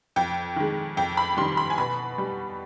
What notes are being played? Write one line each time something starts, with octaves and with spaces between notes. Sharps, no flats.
F2 G5
D#3 G#3
F2 G5
B5
D#3 G3 C6
B5
G#5
B2 B5
G3